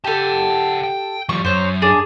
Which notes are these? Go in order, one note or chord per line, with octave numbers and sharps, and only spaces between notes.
G4 A4 F#5 A5
G5
F3 G3 C#6
F#2 C5 C#5
D4 G#4